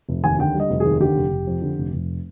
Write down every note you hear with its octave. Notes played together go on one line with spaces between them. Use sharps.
F1
D#2 G#5
D3 G5
G3
D#5
F1
G#4
D#2
D3 G4
F1
F1
F2
D3
F1
F1